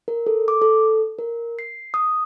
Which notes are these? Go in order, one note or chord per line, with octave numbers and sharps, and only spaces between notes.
A#4
A4
D6
A4
A#4
C7
D#6